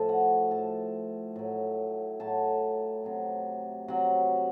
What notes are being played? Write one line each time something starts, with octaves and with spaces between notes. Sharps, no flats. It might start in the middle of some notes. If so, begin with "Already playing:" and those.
Already playing: A2 F3 A4 A5
F#4 F#5
A2 F3 A4 A5
A2 F#3
A2 F#3 A4 A5
C3 F#3
C3 F#3 F#4 F#5